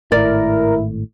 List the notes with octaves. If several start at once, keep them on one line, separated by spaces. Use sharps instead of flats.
G#1 A2 E4 A#4 D5